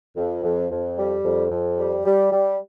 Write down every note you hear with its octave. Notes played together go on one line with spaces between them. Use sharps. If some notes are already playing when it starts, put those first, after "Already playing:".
F2
F2
F2
G3
F2
F2
G3
G3
G3